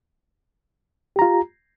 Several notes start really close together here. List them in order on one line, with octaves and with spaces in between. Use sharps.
G4 A#5 F4